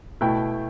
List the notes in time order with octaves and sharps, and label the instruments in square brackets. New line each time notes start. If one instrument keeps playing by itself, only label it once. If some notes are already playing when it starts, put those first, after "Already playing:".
[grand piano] B2 A3 E4 G5